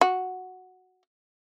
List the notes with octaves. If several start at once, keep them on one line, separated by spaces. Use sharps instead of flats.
F#4